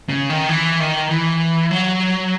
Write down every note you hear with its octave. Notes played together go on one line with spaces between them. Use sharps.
C#3
D#3
E3
D#3
E3
F#3